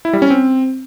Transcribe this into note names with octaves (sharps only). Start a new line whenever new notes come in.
E4
G3
C#4
C4